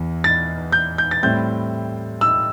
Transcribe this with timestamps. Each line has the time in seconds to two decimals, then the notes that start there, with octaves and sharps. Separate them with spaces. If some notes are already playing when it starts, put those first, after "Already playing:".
Already playing: E2 E3 E4
0.24 A6
0.72 G6
0.98 G6
1.11 A6
1.23 A2 G3 C4 E4 G6
2.21 E6